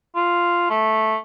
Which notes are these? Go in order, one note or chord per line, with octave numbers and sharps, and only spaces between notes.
F4
A3